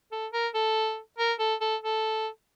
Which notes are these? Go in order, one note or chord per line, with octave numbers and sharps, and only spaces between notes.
A4
A#4
A4
A#4
A4
A4
A4